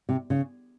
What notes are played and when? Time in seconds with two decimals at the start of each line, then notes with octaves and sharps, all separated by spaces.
0.09 C3
0.30 C#3